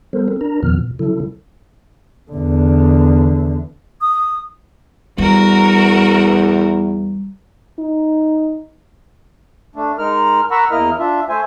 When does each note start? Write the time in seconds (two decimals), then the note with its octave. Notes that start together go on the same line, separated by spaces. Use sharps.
0.13 G3 B3 A4 A#4 C5
0.28 C4 A4 A#4
0.41 D4 A#4 A#5
0.63 E2 A#2 D#3 F3 B3 F6
0.78 A#2
0.99 C#3 F#3 E4 A4
2.32 E2 D3
4.01 D#6
5.18 E2 G3 F#4 A#4
7.79 D#4
9.76 A3 D4
9.99 G#3 D#4 A#4 F6
10.51 A#4 F#5 A#5 B5 C#6 E6
10.71 E2 A#3 E4 A#4 D#5 F6
10.99 D4 F4 E5
11.29 A3 C5 E5 G#5